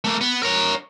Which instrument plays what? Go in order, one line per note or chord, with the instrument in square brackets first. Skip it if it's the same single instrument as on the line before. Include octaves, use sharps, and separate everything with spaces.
[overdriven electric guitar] A3 A#3
B3
A#4 C#5